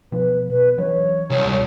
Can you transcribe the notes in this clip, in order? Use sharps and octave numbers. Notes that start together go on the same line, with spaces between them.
B2 F3 B4
B2 B4
E3 F#3 C#4 C#5
C2
D1 A#1 G3